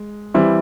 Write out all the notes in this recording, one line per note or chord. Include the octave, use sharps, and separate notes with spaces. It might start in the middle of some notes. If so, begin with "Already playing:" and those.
Already playing: G#3
E3 G3 C4 E4